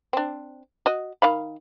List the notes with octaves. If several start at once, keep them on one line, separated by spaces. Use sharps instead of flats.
C4 D4
F#4 D#5
D#3 F5 B5